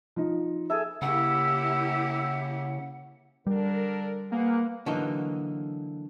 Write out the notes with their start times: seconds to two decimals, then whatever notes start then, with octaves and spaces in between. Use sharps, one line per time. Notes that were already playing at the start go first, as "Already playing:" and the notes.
0.16 F3 D#4
0.70 G#4 A4 E5
1.02 C#3 A#3 E4 G4 F#5 E6
3.47 D3 G3 D4 A#4
4.32 A#3 G#4 B4 F#5
4.86 D3 E3 F#3 A#3 D#4